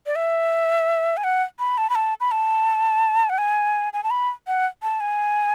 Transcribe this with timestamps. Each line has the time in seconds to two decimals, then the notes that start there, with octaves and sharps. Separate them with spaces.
0.06 D5
0.16 E5
1.17 G#5
1.24 F#5
1.59 B5
1.78 A5
1.90 B5
1.95 A5
2.20 B5
2.31 A5
3.30 F#5
3.38 G#5
3.93 G#5
4.04 A5
4.11 B5
4.47 F#5
4.83 A5
5.00 G#5